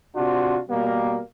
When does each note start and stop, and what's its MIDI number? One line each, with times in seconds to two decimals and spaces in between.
0.15 0.58 48
0.15 0.58 62
0.15 0.58 65
0.15 0.58 66
0.69 1.19 47
0.69 1.19 55
0.69 1.19 58